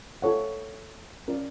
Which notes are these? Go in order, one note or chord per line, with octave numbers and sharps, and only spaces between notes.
F4 A4 C#5 F#5
C#4 F4 A#4 D5